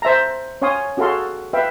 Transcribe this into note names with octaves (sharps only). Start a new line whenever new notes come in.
C5 E5 A5 A#5
C#4 C#5 F5 G#5 C6 D#6
C#4 F#4 G#4 A4 F5 C6
B4 E5 F5 G5